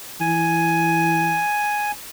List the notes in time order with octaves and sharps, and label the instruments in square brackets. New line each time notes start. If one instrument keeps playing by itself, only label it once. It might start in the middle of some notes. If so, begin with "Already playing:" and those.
[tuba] E3 [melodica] G#5